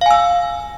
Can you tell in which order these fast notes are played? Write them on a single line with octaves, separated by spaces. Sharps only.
F5 G#5 E6